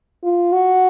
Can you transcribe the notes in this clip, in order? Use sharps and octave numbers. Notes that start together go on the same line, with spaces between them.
F4
F#4